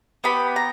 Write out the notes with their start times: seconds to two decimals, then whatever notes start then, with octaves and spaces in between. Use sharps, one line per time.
0.24 B3 G4 B5
0.56 A#5